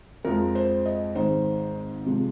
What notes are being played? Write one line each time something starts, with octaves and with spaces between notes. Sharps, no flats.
F2 F3 G#3 A#4
C5
D#5
G#1 G#2 D#3 G#3 C5
C3 F3 G#3